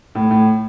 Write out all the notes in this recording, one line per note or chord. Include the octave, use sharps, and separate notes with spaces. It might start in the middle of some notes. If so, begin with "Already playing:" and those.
A2
A2